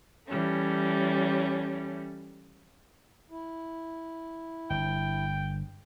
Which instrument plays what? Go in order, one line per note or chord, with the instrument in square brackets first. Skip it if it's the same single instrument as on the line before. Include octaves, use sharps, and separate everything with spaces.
[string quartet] E3 G3 A3 C#4
[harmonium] E4
[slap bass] G1 [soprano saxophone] G5